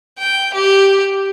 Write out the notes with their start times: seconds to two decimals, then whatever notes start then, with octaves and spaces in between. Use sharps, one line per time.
0.19 G5
0.53 G4